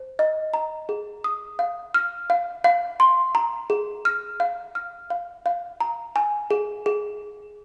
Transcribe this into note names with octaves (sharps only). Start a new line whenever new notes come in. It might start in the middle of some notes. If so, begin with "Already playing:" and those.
Already playing: C5
D#5
A#5
G#4
D#6
F5
F6
F5
F5
C6
A#5
G#4
F6
F5
F6
F5
F5
A#5
G#5
G#4
G#4